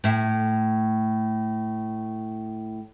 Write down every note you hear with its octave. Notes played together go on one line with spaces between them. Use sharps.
A2 E5